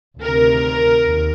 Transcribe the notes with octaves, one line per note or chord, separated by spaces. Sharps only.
D2 C3 D#3 A#4
D#2